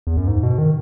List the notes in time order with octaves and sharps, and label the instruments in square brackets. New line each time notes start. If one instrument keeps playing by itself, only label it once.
[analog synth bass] E2
F#2
G#2
B2
D#3